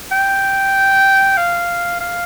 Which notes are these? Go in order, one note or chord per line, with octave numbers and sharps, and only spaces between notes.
G5
F5
F5